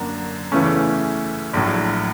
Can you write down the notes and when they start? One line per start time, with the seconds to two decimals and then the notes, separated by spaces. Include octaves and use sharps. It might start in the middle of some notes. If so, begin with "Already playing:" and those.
Already playing: F#2 D3 F#3 A#3 D4
0.52 E2 C#3 E3 A3 C#4
1.54 A#1 A2 F#3